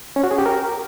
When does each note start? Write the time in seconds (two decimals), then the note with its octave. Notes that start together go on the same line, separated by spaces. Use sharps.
0.16 C#4
0.24 F#4
0.31 G#4
0.38 G4
0.46 A#4